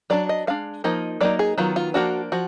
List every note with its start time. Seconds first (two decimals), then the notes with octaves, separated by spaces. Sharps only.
0.10 F#3 D4 D5
0.29 D#5
0.47 G#3 D4 F5
0.84 F3 A#3 D#4 D#5
1.21 F#3 A#3 D#4 D5
1.39 G#4
1.58 D#3 F#3 B3 F4
1.76 F4
1.94 F3 A#3 D4 F#4
2.32 F3 F#4